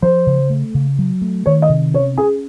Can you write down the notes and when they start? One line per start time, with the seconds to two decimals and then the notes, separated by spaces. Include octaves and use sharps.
0.02 F3 C5
0.27 C#3
0.50 A3
0.75 C#3
0.99 F#3
1.22 A3
1.46 D#3 C#5
1.62 D#5
1.70 C3
1.94 C#4 C#5
2.18 C#4 G#4